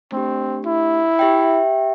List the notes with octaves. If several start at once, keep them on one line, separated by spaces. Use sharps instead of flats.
A3 C4 D4 G4
E4
G4 E5 G5